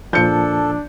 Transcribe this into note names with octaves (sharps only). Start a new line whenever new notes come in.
A#2 F3 D4 A4 G6 C#7